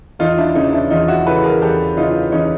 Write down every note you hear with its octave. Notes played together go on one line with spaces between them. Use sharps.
E2 D#4 F4
D4 E4
C#3 E3 C#4 D#4
D4 E4
E2 D#4 F4
E4 F#4
C#3 E3 A4 B4
G#4 A#4
E2 G4 A4
C#3 E3 D#4 F4
E2 C#4 D#4